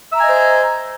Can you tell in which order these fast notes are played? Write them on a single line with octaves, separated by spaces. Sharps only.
E5 A#5 G#5 D#5 C5